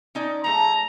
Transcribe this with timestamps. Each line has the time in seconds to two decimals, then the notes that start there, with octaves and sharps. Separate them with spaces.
0.15 C#4 D#4 D5
0.44 F3 A3 G#4 A#5